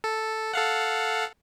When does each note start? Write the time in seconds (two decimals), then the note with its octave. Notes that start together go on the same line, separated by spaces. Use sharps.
0.04 A4
0.53 A4 F5 F#5